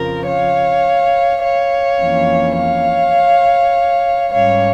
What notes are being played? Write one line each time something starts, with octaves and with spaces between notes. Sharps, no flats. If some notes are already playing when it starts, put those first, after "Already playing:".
Already playing: F2 C#3 F3 A#4
C#5 F5
C#5 F5
F2 E3 A#3 C#4
C#5 F5
G#2 G3 C#4 C#5 F5